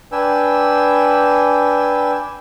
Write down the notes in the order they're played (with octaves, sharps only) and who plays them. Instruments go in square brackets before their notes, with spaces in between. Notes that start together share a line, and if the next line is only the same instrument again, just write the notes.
[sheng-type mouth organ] D4 B4 G5 G#5 E6